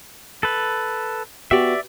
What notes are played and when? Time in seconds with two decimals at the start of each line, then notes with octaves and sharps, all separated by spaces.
0.43 A4 B4
1.51 B3 F#4 G4 D5 E5